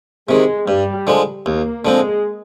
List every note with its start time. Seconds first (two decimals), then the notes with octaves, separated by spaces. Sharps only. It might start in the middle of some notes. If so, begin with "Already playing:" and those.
0.29 C3 D#3 G#3
0.68 G2 G3
1.07 D3 F3 G#3
1.45 D#2 A#3
1.85 D3 F3 G#3 C4